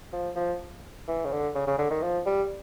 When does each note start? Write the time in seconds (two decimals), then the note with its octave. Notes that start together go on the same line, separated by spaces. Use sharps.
0.13 F3
0.36 F3
1.08 E3
1.25 C#3
1.32 D3
1.55 C#3
1.67 C#3
1.78 D3
1.90 D#3
2.02 F3
2.26 G3